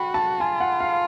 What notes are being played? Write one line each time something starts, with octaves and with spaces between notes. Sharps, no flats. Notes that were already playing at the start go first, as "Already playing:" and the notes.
Already playing: F#4 G5 B5
A5
F4 G#5
F#5
F5